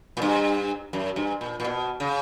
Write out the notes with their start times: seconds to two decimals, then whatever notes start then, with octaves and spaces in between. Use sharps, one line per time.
0.17 A#2
0.22 G2
0.93 F#2
1.16 G2
1.41 A#2
1.60 A#2
1.64 B2
2.00 C#3